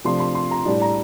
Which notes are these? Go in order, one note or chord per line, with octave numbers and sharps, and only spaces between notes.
C3 F3 A3 D4 C6
C6
C6
A#5
A2 G3 D4
A#5